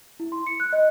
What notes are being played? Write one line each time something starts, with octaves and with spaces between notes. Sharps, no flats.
E4
C6
C#7
F#6
D#5